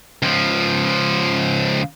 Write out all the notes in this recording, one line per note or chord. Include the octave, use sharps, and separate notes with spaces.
C#2 F3